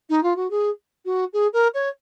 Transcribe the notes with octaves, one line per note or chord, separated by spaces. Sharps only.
D#4
F4
F#4
G#4
F#4
G#4
A#4
C#5